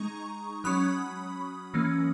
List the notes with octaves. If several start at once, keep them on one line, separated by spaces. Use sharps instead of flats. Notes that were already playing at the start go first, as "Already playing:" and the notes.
Already playing: G#3 D#4 A#5 C#6
F#3 C#4 B5 D#6
E3 A#3 C#4